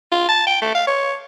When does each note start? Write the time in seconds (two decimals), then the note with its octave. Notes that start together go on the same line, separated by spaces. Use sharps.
0.12 F4
0.29 A5
0.47 G5
0.62 A3
0.75 F5
0.87 C#5